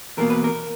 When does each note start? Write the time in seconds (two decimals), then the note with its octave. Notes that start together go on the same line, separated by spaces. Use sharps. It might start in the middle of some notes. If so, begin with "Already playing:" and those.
0.17 E2 B2 A#3 A#4
0.30 B4
0.44 A#4